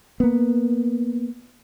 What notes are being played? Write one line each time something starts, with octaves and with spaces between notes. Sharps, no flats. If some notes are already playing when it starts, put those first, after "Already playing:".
A#3 B3